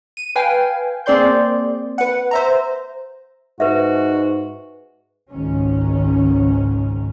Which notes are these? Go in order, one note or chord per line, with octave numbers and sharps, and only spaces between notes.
D#7
B4 F5 G5 G#5
A#3 C4 G#4 D5 C6 G6
B4 F#5
C5 E5 A#5
G#2 F#4 B4 E5
G#1 C#2 G#2 D#3 C#4